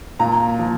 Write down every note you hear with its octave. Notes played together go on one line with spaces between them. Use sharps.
A#2 A#5
F3